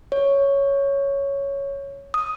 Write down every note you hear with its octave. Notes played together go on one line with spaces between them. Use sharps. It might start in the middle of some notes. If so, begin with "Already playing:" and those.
C#5
D#6